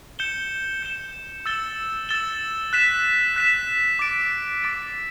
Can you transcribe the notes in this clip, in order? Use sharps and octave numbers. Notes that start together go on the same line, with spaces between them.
G6 C#7 E7 G7
G6 C#7 E7 G7
E6 A6 E7 G7
E6 A6 E7 G7
F#6 B6 E7
F#6 B6 E7
D6 A6 D7
D6 A6 D7